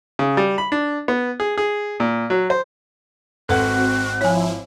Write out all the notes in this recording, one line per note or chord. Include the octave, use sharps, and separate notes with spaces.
C#3
G3
B5
D4
B3
G#4
G#4
A#2
F#3
C5
G#1 C4 F#4 A4 B4 F#5 F#6
F3 E4 C#5 G#5